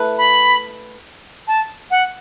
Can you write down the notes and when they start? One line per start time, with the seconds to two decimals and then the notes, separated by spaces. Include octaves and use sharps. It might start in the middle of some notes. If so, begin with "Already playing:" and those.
Already playing: A3 E4 B4
0.18 B5
1.48 A5
1.91 F#5